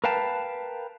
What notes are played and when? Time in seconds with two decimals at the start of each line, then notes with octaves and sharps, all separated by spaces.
0.04 A#4 B4 F5 G5 A5